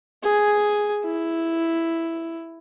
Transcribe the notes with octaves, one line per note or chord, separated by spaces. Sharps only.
G#4 G#5
E4